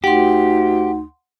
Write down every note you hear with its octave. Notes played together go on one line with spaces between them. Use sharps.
D2 D#4 G4 F#5 C6